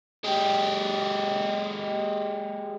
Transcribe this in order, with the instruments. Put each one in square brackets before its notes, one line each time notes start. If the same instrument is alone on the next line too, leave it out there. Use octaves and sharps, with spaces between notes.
[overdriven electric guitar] G#3 G4